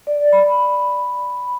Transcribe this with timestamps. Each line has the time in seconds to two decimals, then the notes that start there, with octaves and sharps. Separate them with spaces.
0.07 D5
0.33 B5